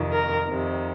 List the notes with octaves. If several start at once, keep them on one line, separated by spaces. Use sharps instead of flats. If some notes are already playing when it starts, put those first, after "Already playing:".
Already playing: F2 C3 D#3
A#4
F2 C3 D#3